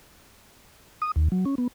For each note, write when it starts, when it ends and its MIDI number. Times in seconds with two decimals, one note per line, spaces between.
1.02 1.11 87
1.16 1.28 39
1.32 1.45 54
1.45 1.55 61
1.58 1.67 59